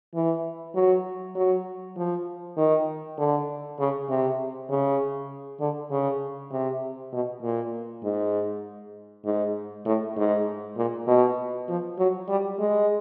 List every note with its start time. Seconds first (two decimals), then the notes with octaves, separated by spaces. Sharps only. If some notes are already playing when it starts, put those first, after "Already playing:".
0.15 E3
0.75 F#3
1.35 F#3
1.97 F3
2.57 D#3
3.18 D3
3.79 C#3
4.09 C3
4.69 C#3
5.60 D3
5.90 C#3
6.51 C3
7.12 B2
7.42 A#2
8.03 G#2
9.25 G#2
9.85 A2
10.17 G#2
10.76 A#2
11.07 B2
11.68 F3
11.98 F#3
12.28 G3
12.59 G#3